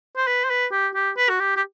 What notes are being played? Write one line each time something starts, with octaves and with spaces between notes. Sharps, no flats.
C5
B4
C5
B4
G4
G4
B4
F#4
G4
G4